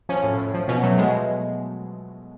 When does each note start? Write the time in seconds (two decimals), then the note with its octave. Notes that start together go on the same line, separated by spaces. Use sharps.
0.09 F3 C#4
0.23 A2
0.38 A2
0.54 F3
0.68 B2 C#4
0.83 F#3 A3
0.98 B2 G#3